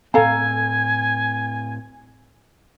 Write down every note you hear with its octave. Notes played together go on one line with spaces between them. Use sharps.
A2 C4 A4 F5 G#5 A#5